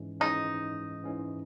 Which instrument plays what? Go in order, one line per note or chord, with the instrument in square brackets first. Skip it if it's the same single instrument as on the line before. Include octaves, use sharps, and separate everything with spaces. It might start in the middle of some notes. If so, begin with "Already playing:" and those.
Already playing: [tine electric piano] G#2 E3 G#3 C#4
[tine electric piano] G#2 E3 G#3 C#4 [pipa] D#4
[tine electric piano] G#2 E3 G#3 C#4